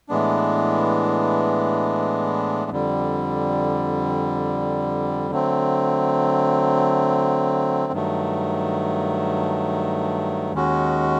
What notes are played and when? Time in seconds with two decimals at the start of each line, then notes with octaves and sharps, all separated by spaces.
0.09 A2 E3 G#3 B3 D4
2.71 F2 D3 G3
5.31 D3 F#3 A3 C4
7.92 G2 D#3 F#3 A3
10.53 D#2 D#3 G#3 C#4 F#4